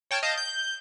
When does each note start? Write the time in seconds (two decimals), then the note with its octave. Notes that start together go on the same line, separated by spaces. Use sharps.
0.11 C#5 G5 A5 F6
0.23 D#5 F5 A5 G6
0.38 G6